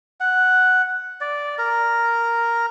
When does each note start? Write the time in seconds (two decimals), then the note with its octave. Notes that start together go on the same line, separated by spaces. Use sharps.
0.20 F#5
1.21 D5
1.58 A#4